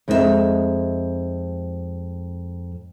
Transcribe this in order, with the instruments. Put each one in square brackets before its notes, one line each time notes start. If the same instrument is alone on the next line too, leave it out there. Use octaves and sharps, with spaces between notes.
[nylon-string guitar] F2 G#3 C4 D#4 G#4 E5